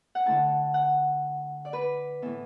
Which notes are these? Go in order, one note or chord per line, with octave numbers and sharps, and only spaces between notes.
F#5
D3 A3 E4 A5
F#5
D5
B4
A2 E3 B3